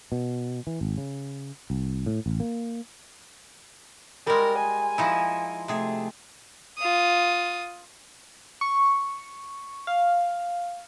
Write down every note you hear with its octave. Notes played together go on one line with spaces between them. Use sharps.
B2
E3
G#1
C#3
C2
A2
A1
A#3
G3 G#3 A#4
G#5
F3 D#4 E4
C3 A3 G#4
F4 D#6
C#6
F5